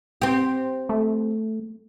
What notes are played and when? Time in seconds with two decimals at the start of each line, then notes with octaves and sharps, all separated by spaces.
0.22 C4 G4
0.89 A3